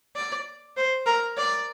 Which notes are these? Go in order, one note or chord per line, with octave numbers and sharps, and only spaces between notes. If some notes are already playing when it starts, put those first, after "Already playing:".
D5
C5
A#4
D5